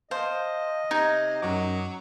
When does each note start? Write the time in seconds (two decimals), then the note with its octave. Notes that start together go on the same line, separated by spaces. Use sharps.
0.11 C5 D#5 F5 A5
0.91 C3 D#4 G#6
1.42 F#2 F#3 D6